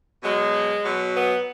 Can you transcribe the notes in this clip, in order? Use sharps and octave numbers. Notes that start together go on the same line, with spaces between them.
B2 F#3 G#3
B2 F#3
B3